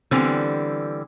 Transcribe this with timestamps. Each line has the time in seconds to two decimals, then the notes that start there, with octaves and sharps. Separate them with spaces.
0.11 D3 E3 G3 B3 C4